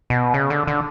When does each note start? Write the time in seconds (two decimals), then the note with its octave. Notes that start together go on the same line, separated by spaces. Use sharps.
0.10 B2
0.34 C#3
0.50 D3
0.67 D3